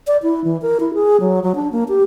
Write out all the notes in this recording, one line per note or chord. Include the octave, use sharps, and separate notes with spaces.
D5
E4
E3
A#4
E4
G#4
F#3
F#3
D4
A#3
G4